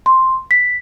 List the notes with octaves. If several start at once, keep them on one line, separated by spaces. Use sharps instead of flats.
C6
B6